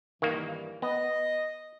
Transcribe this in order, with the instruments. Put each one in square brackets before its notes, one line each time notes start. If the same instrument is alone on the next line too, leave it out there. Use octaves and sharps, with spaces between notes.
[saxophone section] G2 E3 [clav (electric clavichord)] D#3 A#3
[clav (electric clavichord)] B3 [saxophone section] D#5